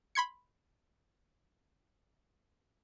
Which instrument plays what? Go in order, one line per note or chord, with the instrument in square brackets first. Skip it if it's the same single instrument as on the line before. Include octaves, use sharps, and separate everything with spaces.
[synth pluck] B5 C6 G#6 C#7